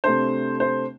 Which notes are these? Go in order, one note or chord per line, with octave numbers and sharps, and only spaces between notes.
C3 A3 D4 C5
C5